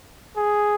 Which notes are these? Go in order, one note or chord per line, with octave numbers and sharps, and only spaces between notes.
G#4